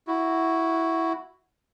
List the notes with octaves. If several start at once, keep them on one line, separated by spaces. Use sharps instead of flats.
E4 F#4